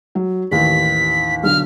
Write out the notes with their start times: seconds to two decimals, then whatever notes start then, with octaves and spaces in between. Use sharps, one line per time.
0.15 F#3
0.52 A1 D#2 B6
1.44 B1 D3 F6